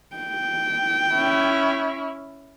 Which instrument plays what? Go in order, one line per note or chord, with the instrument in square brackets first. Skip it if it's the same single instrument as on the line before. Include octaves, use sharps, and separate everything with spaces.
[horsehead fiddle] G5
[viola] C#4 E4